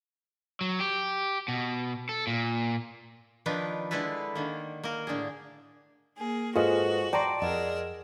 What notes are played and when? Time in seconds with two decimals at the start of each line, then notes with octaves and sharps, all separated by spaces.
0.61 F#3
0.80 G4
1.48 B2
2.09 A4
2.27 A#2
3.46 D#3 F3 D4 D#4 A#4 B4
3.91 D3 G#3 E4 A4 B4
4.35 D3 D#3 A#3
4.84 A#3 A#4
5.07 A2 D3 D4 G#4
6.18 A#3 G#4
6.56 G#2 F4 F#4 G#4 A4 B4 C5 D#5
7.13 D5 G5 A5 A#5 C6 D7
7.42 F2 G#4 A#4 D#5 F#5 E6